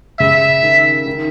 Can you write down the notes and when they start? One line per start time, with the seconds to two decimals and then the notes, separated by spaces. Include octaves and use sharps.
0.20 C#3 E5
0.63 D#3
1.06 D#3